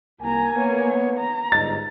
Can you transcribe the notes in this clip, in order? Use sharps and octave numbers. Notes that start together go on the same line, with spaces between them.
C2 A#3 A#4 G#5 A#5
A#3 B3 C#5
A#5
G1 G#2 D#5 A6